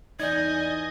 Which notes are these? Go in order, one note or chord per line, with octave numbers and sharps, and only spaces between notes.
E2 D#4 D5 D#5 G#5 G6 G#6